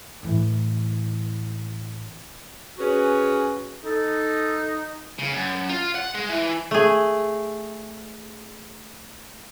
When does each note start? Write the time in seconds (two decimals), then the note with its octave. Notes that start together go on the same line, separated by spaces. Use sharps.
0.23 A2 E3
2.79 C#4 F#4 G#4 B4
3.84 D#4 A4
5.19 C#3
5.32 F#2
5.69 F4
5.95 F#5
6.14 G#3
6.29 E3
6.71 A3 G#4